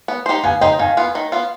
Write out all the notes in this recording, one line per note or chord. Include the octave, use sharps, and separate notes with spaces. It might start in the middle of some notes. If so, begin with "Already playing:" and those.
B3
D#4 G4 C5
B3 F5 G#5
D#4 G4 C5 D#5 G5
D#3 F5 G#5
B3 F4
D#3
B3 F4